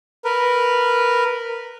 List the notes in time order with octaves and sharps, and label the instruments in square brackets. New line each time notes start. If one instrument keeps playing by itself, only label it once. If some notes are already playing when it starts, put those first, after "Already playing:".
[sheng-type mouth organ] A#4 B4